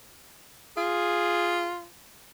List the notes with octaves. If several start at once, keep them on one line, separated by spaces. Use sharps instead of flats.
F4 G#4